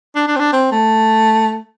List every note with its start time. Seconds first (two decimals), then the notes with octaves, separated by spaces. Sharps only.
0.15 D4
0.28 D4
0.36 C4
0.40 D4
0.53 C4
0.72 A3